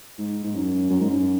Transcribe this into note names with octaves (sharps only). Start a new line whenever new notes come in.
G#2
G#2
F#2
F#2
G#2
F#2